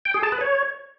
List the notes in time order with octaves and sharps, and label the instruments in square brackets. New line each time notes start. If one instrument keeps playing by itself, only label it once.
[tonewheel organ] G5
G#4
A5
B4
C#5